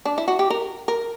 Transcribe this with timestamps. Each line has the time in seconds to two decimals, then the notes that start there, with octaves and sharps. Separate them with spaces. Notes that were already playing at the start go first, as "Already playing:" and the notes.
0.05 D4
0.18 E4
0.28 F#4
0.39 G4
0.50 A#4
0.88 A#4